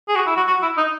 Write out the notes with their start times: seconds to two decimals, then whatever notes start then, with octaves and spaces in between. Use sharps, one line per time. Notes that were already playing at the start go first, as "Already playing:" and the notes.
0.09 G#4
0.15 F#4
0.27 E4
0.36 F#4
0.47 F#4
0.62 E4
0.77 D#4